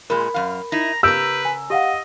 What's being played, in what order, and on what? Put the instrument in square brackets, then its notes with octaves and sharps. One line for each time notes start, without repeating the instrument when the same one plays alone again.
[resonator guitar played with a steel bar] A#2 G#3 [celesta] A#4 B5
[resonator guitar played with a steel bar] F#2 F5
[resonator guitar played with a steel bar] D#4 E4 [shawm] A#5
[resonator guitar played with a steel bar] C#3 A#4 A#5 [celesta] G4 G6 D7 [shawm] B4 [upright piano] E6
[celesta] G#5
[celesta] G4 F5 F#5 [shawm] D#5